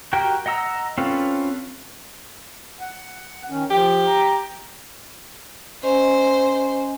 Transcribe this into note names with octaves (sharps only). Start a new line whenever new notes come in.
F#4 G4 A#4 G5
D#5 F#5 A#5 E6
C4 C#4 F4 A4 B4
F#5
D#3 C#4
F3 G4
A#5
C#4 C5 D#5 G#5